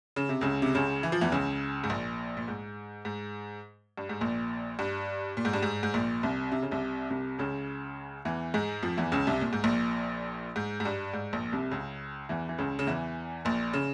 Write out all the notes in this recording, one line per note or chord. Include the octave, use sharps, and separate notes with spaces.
C#3
C3
C#2 C#3
C3
C#2 C#3
E3
F3
E2 E3
C#2 C#3
G#2
A#1 A#2
A#2
G#2
G#2
G2
G#2
A#1 A#2
G2
A#2
G#2
G2
G#2
G#2
A#1 A#2
C2 C3
C3
C#3
C2 C3
C2 C3
C#2 C#3
E2 E3
G#2 G#3
F2 F3
E2 E3
C#2 C#3
C2 C3
A#2
G#2
A#1 A#2
G#2
G#2
G2
G#2
A#1 A#2
C2 C3
C#2 C#3
E2 E3
E3
C#2 C#3
C#3
E2 E3
A#1 A#2
C#3